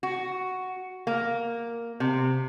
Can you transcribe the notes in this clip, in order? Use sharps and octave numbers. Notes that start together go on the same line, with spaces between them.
F#4
A#3
C3